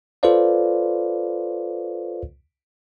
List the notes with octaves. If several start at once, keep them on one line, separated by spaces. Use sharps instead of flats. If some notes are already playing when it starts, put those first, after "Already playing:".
F4 A4 B4 C5 D5 F5